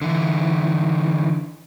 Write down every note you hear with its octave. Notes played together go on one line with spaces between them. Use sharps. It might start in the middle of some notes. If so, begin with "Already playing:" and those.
D3 E3